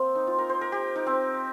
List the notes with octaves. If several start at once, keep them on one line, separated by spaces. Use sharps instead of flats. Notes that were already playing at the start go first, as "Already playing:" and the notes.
Already playing: A#3 C4
D#4
F4
A#4
C5
A#4
G4
D#4
C4